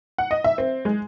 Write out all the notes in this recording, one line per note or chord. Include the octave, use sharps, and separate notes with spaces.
F#5
D#5
E5
C4
G#3